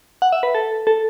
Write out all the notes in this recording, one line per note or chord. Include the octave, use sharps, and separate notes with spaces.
F#5
E5
B4
A4
A4